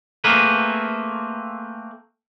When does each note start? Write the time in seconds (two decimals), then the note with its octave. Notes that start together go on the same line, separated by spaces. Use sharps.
0.24 A3 A#3 C4 G#4 A#4 B4